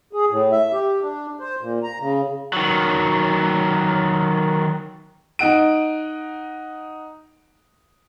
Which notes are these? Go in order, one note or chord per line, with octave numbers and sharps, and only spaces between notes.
G#4
A2
E5
G4
D4
C5
A#2
A#5
C#3
D#3 F#3
D#4 D#5 F#5 D7